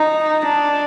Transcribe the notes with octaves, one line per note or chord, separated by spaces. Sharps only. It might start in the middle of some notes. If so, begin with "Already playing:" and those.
Already playing: D#4
D4